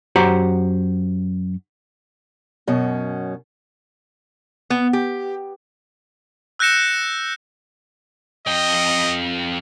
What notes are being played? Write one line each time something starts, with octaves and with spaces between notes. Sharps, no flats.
F#2 F#4 G4 C5 F#5 A#5
F#2 B2 C#4
B3
G4
E6 F#6 G6 A#6 C#7 E7
F2 D#5 G5